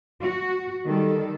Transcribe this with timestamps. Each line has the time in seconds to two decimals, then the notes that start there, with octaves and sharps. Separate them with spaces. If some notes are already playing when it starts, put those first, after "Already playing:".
0.22 F#4
0.85 D#3 G3 A4